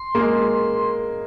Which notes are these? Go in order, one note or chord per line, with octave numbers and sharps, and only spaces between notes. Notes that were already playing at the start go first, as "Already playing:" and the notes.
Already playing: C6
A#3
G#3